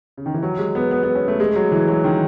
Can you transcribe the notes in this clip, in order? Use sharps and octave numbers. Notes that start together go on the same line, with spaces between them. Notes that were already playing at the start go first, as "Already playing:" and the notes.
C#3
D#3
E3
F#3
G#3
B3
B3
B3
C#4
A3
G#3
F#3
E3
F#3
D#3